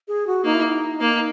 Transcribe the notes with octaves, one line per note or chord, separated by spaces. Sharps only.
G#4
F#4
A#3 D#4
E4
D#4
A#3